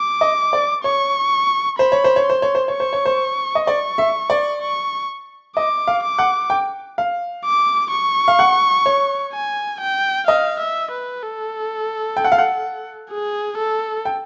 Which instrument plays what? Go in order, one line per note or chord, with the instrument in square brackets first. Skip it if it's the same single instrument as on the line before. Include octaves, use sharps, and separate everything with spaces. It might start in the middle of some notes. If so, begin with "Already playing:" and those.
Already playing: [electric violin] D6
[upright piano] D#5
D5
[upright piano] C#5 [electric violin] C#6
[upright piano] C5 [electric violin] B5
[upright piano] C#5
C5
C#5
[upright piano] C5 [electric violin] C6
[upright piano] C#5
C5
C#5
[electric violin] C#6
[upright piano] C5
C#5
C5
D#5
[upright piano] D5 [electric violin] C#6
[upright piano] E5
D5
[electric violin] C#6
[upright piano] D#5 [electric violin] D6
[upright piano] F5
[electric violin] D6
[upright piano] F#5
G5
F5
[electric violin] D6
C#6
[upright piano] F5
F#5
C#5
[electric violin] G#5
G5
[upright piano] D#5 [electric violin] F5
[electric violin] E5
B4
A4
[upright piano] G5
F#5
F5
F#5
[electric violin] G#4
A4
[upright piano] G5